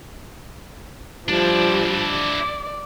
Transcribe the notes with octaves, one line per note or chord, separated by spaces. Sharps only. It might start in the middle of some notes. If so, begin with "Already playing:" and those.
F3 G3 D4 E4
D5